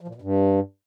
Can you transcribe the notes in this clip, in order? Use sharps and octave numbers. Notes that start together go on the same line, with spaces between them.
F3
A#2
B2
G2